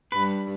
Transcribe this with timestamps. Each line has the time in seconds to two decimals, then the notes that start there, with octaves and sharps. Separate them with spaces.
0.12 G2 B4